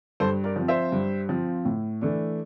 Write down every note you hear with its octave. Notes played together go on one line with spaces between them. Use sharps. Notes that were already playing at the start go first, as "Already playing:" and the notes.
G2 A4 C5
A#4 D5
F3 C4
C5 E5
G2
F3 C4
A2
E3 A3 D4